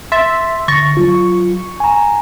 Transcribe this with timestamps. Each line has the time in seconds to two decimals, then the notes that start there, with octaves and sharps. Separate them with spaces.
0.12 E5 C6 A6
0.68 D3 C#6 A6 A#6
0.97 F#3 F4
1.80 G#5 A#5